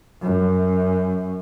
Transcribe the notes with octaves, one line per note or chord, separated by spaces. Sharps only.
F#2